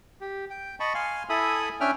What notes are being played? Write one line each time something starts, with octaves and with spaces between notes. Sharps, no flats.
G4
G5
D#5 A5 B5 C#6
F5 G#5 C6
E4 A4 E5 G#5 B5 D#6
C#4 D4 E5 G5 F6